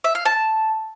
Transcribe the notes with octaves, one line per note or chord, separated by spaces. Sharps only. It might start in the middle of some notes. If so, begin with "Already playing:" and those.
E5
F5
A5